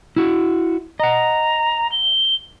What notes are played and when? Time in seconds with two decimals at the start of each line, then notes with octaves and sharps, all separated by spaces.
0.16 E4 F#4
1.00 D#5 F#5 A#5
1.92 G7